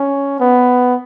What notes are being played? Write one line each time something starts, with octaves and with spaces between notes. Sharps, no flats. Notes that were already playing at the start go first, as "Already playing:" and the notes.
Already playing: C#4
B3